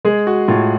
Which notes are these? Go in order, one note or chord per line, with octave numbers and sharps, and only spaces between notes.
G#3 G#4
F#4
A2 F4